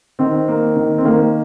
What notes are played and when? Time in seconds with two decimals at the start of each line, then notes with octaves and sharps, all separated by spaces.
0.19 D#3 C4
0.48 A#3
0.77 D#3
0.98 C4
1.05 D#3 A#3